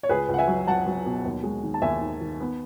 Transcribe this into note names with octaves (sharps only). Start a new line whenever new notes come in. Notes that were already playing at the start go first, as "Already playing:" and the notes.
C#5
C#2 G#4 B4
C#2
F#5
E5 G#5
F#3
F#3 F#5 A5
F#3
B2
D#2
G#3
D#3
A5
D#2 E5 G#5
D#3
D#3
B3